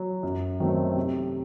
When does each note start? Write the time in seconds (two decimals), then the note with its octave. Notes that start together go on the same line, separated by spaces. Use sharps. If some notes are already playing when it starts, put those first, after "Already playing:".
Already playing: F#3
0.23 F#2
0.60 D#3 F#3 A3 C4
0.96 C3